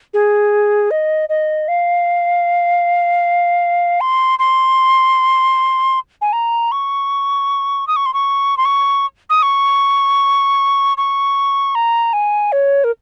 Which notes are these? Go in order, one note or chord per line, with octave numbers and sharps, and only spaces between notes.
G#4
D#5
D#5
F5
C6
C6
G#5
A#5
C#6
D#6
C#6
C6
C#6
C6
C#6
D#6
C#6
C#6
A#5
G#5
C#5
A#4